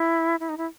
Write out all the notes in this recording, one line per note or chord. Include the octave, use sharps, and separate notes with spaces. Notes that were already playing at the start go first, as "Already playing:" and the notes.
Already playing: E4
E4
D#4
E4